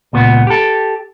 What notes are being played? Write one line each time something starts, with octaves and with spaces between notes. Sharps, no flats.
C#2 A#2 B3
G4 A4